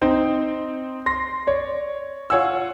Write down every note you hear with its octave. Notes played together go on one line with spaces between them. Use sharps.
C4 D#4 C5 G5
C6 A#6
C#5 D5
F4 C#5 F#5 G#5 E6